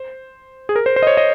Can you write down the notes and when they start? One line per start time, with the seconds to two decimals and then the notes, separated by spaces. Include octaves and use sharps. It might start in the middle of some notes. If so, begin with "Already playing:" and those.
Already playing: C5
0.69 G#4
0.76 A#4
0.86 C5
0.96 C5
1.03 D#5
1.07 C#5
1.17 D#5